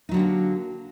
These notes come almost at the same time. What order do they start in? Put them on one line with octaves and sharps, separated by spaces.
D#4 F#3 D3 G4 A#3